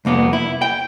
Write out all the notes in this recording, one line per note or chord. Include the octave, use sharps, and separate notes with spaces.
C2 F2 A#3 B3
E4
G5